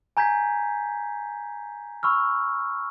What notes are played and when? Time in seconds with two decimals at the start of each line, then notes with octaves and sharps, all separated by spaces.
0.17 G#5 A#5 G6 G#6 B6
2.03 B5 C#6 E6 F6